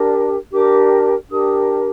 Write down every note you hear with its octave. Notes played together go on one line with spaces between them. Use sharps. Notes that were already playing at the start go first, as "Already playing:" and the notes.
Already playing: D4 G4 A#4
D4 G4 A#4 D6
D4 G4 A#4 D#6